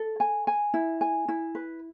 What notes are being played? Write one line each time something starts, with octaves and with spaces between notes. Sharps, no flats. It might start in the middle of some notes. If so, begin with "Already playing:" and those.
Already playing: A4
G#5
G#5
E4
G#5
E4
B4